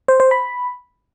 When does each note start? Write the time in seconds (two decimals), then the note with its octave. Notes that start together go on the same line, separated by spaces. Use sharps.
0.08 C5
0.20 C5
0.31 B5